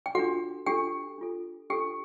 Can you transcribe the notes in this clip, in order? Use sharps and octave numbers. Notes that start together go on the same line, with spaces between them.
G5
D4 F4 F#4 A4 F#5
D4 F4 G4 A4 G5
D4 F4 A4
D4 F4 G4 A4 G5